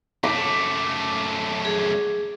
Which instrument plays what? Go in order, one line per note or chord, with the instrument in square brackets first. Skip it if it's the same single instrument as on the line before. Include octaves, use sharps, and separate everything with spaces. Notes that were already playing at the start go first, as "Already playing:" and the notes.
[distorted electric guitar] F#2 A3 [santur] D6
[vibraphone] G#4